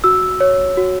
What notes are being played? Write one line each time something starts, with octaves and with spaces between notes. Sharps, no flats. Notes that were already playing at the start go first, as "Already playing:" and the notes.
F#4 E6
C#5
F#4